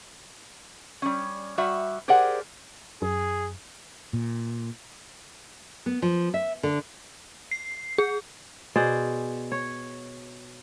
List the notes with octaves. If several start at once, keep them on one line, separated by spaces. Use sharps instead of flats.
G3 C#4
G3 F#4 E5
G4 G#4 A#4 C5 D5 F#5
F#2 G#4
A#2
B3
F3
E5
D3
C7
G#4
B2 G#4 C5 D5
C#5